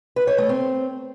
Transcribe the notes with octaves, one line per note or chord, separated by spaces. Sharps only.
B4
C#5
A3
C4